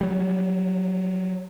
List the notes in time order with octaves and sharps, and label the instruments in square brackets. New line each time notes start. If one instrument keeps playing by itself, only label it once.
[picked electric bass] F#3 G3